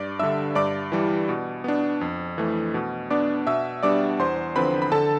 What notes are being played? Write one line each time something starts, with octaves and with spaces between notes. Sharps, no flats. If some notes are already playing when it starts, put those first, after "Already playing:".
Already playing: G2 D5 D6
D3 G3 D4 E5 E6
G2 D5 D6
E3 G3
B2
B3 D4
F2
E3 A3
B2
B3 D4 D5 D6
B2 E5 E6
G3 B3 D4 D5 D6
E2 C5 C6
D3 F3 C4 B4 B5
B5
D3 A4 A5